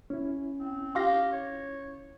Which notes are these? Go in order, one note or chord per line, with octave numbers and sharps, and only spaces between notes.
C#4 E4
C4
F4 G4 F5 A#6
C#5